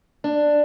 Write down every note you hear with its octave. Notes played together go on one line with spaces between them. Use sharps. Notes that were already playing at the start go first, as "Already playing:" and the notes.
D4